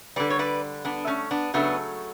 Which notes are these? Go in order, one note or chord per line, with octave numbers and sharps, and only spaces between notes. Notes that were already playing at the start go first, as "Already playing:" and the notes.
D3 G3 B4 D5
C#5
B4 D5
B3 D4
A3 C#4
B3 D4
C#3 F#3 A3 B3 D4